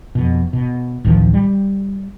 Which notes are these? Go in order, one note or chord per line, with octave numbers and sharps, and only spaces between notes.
F2 B2
B2
D1 A1 D#3 F3
G3